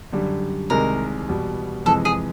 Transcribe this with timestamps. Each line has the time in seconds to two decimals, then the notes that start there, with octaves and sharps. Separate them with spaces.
0.13 F#2 D3 G3
0.70 C2 C3 D#3 G#3 A#4
1.29 E2 B2 G3
1.86 F2 C3 E3 G#3 A4
2.05 G#4